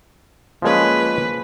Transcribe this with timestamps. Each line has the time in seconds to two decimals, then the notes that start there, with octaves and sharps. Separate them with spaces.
0.62 F3 G#3 A#3 C#4 B4